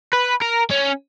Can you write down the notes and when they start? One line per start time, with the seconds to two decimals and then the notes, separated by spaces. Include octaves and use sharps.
0.13 B4
0.42 A#4
0.71 C#4